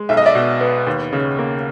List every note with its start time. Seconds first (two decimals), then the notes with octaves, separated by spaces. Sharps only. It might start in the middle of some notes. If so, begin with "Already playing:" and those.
Already playing: G#3
0.09 B1 E5
0.17 D#5
0.26 D5 E5
0.35 B2
0.61 B3
0.87 D#2
1.13 C#3
1.39 A#3